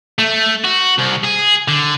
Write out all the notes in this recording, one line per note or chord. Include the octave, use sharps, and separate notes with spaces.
A3
F#4
C2
G#4
D3